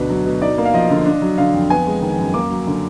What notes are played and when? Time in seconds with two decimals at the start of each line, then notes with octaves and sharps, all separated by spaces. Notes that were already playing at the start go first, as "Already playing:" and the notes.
Already playing: D2 B2 D4 B4
0.10 F#3
0.26 B2
0.41 D#4 D5
0.58 A#3
0.65 F5
0.74 F3 D#5
0.90 D3
1.06 D4
1.22 F#3
1.38 D3 F5
1.54 F2
1.70 B3 G#5
1.87 G#3
2.02 D#3
2.19 F#2
2.34 A#3 D6
2.50 F#3
2.67 D3